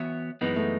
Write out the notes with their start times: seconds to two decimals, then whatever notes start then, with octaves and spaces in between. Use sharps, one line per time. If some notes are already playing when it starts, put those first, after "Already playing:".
Already playing: E3 B3 F#4 C#5 E5
0.41 F#2 E3 G#3 B3 D#4
0.56 A3